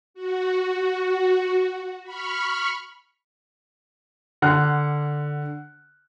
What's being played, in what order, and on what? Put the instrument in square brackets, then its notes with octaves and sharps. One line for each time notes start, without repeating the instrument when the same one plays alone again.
[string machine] F#4
B5 C#6 F6
[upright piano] D3 F#5 F6 F#6